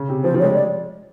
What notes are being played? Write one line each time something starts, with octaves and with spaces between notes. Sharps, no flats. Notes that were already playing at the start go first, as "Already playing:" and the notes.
Already playing: C#3
C3
F3 C5
F3
G#3 C#5
D5